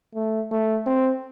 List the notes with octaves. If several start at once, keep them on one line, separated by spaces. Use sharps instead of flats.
A3
A3
C4